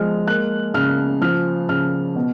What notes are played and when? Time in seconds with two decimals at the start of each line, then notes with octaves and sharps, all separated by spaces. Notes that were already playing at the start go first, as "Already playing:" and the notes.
Already playing: F3 G#3 F6
0.27 A#3 F#6
0.74 C#3 F6
1.21 F3 F6
1.69 C#3 F6
2.15 B2